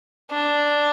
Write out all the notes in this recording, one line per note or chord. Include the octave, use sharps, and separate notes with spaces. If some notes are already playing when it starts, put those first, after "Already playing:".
D4